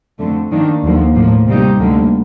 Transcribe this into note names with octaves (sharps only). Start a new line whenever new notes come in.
F2 D3 A3
D#3 A#3 D4
D#2 D3 F3 A#3
A2 F3 A#3
C3 G3 A#3 D#4 G4
D2 D3 G3 A#3